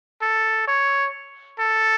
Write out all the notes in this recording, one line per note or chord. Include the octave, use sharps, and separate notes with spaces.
A4
C#5
A4